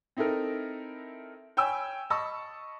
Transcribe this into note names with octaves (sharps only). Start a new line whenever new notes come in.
C4 D#4 E4 A4 A#4
C#5 G5 G#5 B5 E6
D#5 A5 B5 C#6 E6